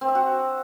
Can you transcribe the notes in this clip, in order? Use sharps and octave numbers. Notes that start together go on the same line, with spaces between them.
C4
E5
F#4